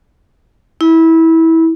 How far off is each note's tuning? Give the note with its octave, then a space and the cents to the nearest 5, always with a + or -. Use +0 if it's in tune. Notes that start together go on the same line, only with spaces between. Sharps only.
E4 -20